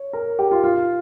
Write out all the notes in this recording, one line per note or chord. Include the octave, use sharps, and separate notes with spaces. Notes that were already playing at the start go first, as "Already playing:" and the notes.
Already playing: C#5
A#4
G4
F4
F4